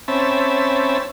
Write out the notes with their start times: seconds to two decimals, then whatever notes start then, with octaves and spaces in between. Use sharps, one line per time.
0.08 C4 C#4 E5 A5 B5